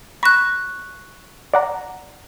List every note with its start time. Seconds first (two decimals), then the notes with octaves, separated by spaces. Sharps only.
0.23 B5 C#6 F#6 A#6 E7
1.54 D5 F#5 A#5